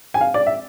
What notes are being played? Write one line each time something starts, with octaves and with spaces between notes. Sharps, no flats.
G#5
F5
D5
E5